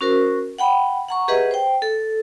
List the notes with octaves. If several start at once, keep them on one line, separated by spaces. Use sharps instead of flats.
C#4 F#4 A#4 C5
F#5 G5 B5
F#5 A#5 C#6
G4 G#4 B4 D#5 E5 F#5
C5 G5
A4